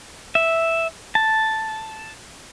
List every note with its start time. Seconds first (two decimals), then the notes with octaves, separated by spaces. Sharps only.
0.35 E5
1.15 A5